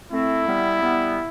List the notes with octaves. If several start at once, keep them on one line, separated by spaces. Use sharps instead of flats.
A3 C4 E4
G3 B3
G3 B3